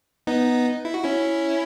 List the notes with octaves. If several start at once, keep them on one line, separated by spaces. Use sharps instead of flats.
B3 D#4
E4
F#4
C#4 E4